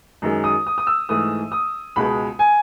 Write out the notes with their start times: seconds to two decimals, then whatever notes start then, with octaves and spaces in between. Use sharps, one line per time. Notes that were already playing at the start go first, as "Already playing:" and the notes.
0.22 F#2 D#3 G#3
0.44 D#6
0.66 D#6
0.78 D#6
0.87 E6
1.09 G#2 E3 A3 D#6
1.52 D#6
1.96 C#2 B2 G#3 B5
2.39 G#5